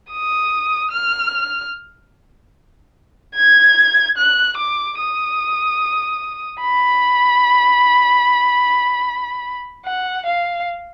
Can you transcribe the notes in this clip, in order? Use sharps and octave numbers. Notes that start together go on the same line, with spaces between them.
D#6
F6
G#6
F#6
D6
D#6
B5
F#5
F5